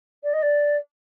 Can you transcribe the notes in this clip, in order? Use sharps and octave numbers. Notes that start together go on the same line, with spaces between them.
D5
D#5
D5